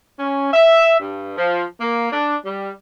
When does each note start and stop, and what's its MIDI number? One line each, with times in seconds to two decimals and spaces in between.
0.19 0.53 61
0.53 0.95 76
0.99 1.31 43
1.36 1.63 53
1.80 2.12 58
2.12 2.35 62
2.45 2.69 55